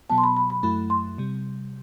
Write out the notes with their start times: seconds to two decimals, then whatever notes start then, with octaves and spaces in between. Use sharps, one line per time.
0.10 B2 F#3 B3 A5
0.18 C6
0.24 B5
0.37 B5
0.50 B5
0.63 F#2 F#3 A3 E4 B5
0.90 C6
1.18 C3 G3